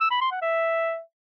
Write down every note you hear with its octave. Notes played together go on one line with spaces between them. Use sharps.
E6
B5
C6
F#5
E5